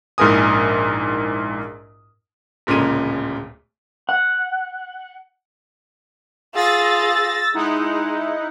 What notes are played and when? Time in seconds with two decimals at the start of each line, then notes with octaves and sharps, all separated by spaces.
0.18 A#1 G#2 E4 A#4 G#5 D#6
2.67 D1 A#2 C#3 G#3 D#7
4.09 F#5
6.55 F4 G#4 E6 A6 A#6
7.54 G#3 D#4 E4 F#5